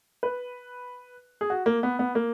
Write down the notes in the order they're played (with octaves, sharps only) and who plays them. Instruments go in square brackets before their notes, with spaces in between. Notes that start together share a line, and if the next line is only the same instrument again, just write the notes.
[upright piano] B4
G#4
F#4
A#3
B3
B3
A#3